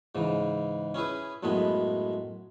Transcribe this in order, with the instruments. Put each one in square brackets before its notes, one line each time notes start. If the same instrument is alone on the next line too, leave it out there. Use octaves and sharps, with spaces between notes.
[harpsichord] G#2 C#3 E3
C#4 E4 G#4 B4
F#2 A2 G#3 B3 B5